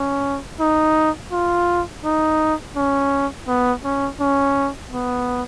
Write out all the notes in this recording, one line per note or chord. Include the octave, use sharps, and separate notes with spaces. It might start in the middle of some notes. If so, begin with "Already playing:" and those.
Already playing: C#4
D#4
F4
D#4
C#4
B3
C#4
C#4
B3